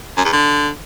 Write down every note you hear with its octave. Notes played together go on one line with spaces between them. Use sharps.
F#2
E2
D3